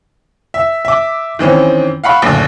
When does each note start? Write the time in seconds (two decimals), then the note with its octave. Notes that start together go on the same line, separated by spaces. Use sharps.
0.54 E5
0.85 E5 D6
1.39 D#3 E3 C4 C#4
2.04 F5 F#5 B5 C#6
2.22 F#1 D2 A#2